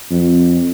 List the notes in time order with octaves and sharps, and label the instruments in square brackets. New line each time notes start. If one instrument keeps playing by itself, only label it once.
[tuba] F2